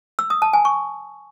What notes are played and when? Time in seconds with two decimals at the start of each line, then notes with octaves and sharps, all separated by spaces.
0.19 E6
0.30 D#6
0.42 A5
0.53 G#5
0.65 C#6